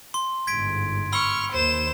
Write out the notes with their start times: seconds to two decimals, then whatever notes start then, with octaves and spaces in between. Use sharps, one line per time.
0.14 C6
0.47 G1 G#2 G#6 B6 D7
1.12 B5 C#6 E6 F6 G7
1.52 D#2 C5 E7